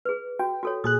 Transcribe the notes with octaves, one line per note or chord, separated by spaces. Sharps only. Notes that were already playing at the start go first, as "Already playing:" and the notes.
G#4 B4
F#4 G5
F#4 A4 C#5
A#2 G#4 D#6 F#6